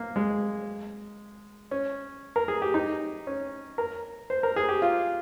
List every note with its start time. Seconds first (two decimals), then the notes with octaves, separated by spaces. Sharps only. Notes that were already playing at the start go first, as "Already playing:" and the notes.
Already playing: A#3
0.16 G#3
1.71 C#4
2.36 A#4
2.48 G#4
2.62 G4
2.74 D#4
3.27 C#4
3.78 A#4
4.30 C5
4.43 A#4
4.56 G#4
4.69 G4
4.82 F4